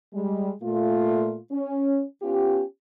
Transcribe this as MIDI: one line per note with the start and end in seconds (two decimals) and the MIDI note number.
0.14 0.50 55
0.14 0.50 56
0.62 1.37 46
0.62 1.37 57
0.62 1.37 65
1.52 2.02 61
2.22 2.62 59
2.22 2.62 61
2.22 2.62 65
2.22 2.62 67